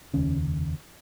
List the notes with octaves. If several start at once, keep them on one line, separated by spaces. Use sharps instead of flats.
F1 D#2 C#3 C#4